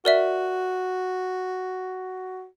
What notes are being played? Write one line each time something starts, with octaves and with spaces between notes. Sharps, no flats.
F#4 A#4 D5 E5